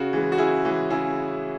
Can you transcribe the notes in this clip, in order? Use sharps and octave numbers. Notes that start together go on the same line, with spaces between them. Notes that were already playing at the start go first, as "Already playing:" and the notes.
Already playing: C#3 F#4
E3 G#3
F#4
C#3 E4 G#4
E3 G#3
C#3 E4 G#4